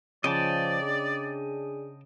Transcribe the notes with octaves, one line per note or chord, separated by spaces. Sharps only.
C#3 F3 D5 D#5 G5 A5
D4 G#4